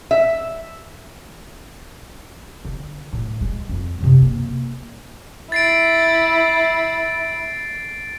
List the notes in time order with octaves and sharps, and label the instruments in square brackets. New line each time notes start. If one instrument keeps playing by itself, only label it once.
[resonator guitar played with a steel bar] E5
[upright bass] D3
A2
G#3
F2
F#2 C3
A#3
[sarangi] E4 [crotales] A6 C7 D7